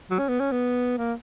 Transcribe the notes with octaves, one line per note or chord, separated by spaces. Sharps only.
F#3
C#4
B3
C#4
B3
A#3